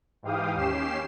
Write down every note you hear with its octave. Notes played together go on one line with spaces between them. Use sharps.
G#2 E3 G4 F5 G5 D#6
D#2 C#4 G4 C7 E7